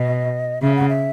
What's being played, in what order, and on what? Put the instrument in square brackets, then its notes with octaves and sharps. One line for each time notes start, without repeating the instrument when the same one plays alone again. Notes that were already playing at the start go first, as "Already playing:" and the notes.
Already playing: [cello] B2 [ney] D#5
[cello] C#3 [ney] E5
[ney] F#5
E5